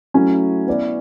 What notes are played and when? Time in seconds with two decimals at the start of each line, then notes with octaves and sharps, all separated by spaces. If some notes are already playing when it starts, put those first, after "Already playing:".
0.14 F#3 A3 C#4 E4
0.67 B3 E4 B4 D5